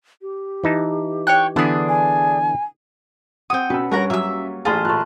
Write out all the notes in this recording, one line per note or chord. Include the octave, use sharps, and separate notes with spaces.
G4
E3 D#4 A5
C#5 G5 F#6
D3 E3 B3 D4 G#4
G#5
C4 G#4 F#5 G5 D#6
B2 C#4 B4 E6
G2 F#4 A#4 C#5 F#5 A#5
F#3 A#3 E5 E6
A1 F4 G#4 C5 A5 C6 F6
A#2 A3 A5 A#5 F#6